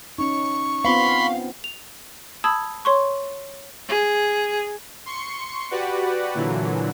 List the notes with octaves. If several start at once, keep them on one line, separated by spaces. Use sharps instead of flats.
C#4 D#4 C#6
B3 C4 F4 F5 B5 C6
F7
A5 B5 D#6 E6 G#6
C#5 C6 C#6
G#4
C6 C#6 C#7
F#4 G4 B4 D5 F#5
A#2 D3 E3 F#3